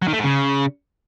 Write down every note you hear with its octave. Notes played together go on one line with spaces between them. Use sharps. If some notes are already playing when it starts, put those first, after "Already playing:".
F#3
D#3
A3
G#2
C#3